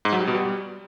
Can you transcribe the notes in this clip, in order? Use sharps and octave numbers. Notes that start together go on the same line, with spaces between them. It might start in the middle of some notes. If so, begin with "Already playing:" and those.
G#2
F#3
G3
B2
G3